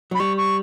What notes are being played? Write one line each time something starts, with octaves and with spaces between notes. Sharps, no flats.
F#3
B5
G3 C#6
C#6